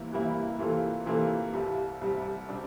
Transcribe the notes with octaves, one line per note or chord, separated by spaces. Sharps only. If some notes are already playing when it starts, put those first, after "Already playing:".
Already playing: C3 E3 G3 A#3 E4
C3 E3 G3 A#3 E4
C3 E3 A#3 F4 A4
C3 E3 A#3 F4 A4
C2 C3 G3
C2 C3 G3
C3 G3 D4